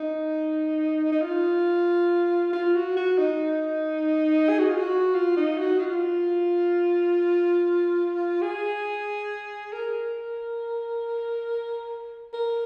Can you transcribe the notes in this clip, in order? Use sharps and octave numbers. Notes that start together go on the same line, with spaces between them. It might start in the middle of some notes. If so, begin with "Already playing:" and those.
Already playing: D#4
D#4
F4
F4
F#4
F#4
D#4
G#4
F#4
F4
F#4
F4
D#4
F#4
F4
G#4
A#4
A#4